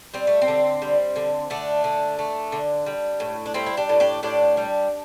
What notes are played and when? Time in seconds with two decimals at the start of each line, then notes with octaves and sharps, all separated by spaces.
0.14 G3 C4
0.27 A3
0.42 C4
0.48 D3
0.82 G3
1.16 D3
1.50 D3 A3 D4
1.84 D3
2.19 A3
2.52 D3
2.86 G3
3.20 A2
3.46 D4
3.54 G3 C4 E4
3.66 E4
3.77 D4 G4
3.89 A2
4.00 D4 G4
4.23 A2 D4 G4
4.57 G3